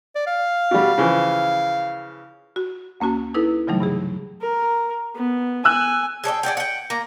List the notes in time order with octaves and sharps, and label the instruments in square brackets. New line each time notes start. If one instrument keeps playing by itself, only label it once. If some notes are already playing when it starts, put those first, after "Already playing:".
[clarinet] D5
F5
[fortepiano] B2 G3
C#3 E3 F3
[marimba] F#4
D2 A#3 C#4 F#4 A5
D#4 E4 A4 B4
C#3 E3 F#3 G3 A3 D#4
G2 C3 G#4
[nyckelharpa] A#4
B3
[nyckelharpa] G#5 [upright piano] E6 F#6
[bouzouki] G#4 A4 D5 G5
G#4 D5 F#5 G5
F#5 G5
A#3 A#5